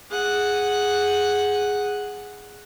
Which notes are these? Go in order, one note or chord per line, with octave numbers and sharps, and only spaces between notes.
G#4 F#5